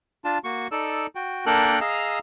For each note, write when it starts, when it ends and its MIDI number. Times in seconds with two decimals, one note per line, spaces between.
0.25 0.38 62
0.25 0.38 65
0.25 0.38 81
0.44 0.67 58
0.44 0.67 66
0.44 0.67 85
0.72 1.07 63
0.72 1.07 69
0.72 1.07 74
0.72 1.07 88
1.15 1.45 66
1.15 1.45 79
1.46 1.80 58
1.46 1.80 62
1.46 1.80 69
1.46 1.80 70
1.46 1.80 79
1.46 1.80 90
1.81 2.19 68
1.81 2.19 75
1.81 2.19 77
1.81 2.19 82
1.81 2.19 88